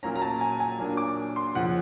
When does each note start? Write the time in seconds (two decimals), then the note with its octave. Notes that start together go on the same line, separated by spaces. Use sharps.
0.03 A#2 F#3 A#3 C#4 A#5
0.16 A#5
0.22 A5
0.41 G#5
0.60 G#5
0.79 A#2 F#3 A#3 D4
0.97 D6
1.36 C6
1.55 F2 C#3 F3 F#5